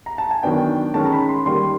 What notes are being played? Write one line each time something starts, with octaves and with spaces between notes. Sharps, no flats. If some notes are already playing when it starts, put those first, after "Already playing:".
A#5
A5
G#5
D#3 F#3 B3 D4 G5
D#3 G#3 C#4 A5
A#5
B5
C6
D#3 G3 A#3 C6